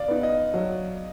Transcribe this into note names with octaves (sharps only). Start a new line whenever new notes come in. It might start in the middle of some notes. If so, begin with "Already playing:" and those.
Already playing: D5 F5
B3 D#4
D#5
F#3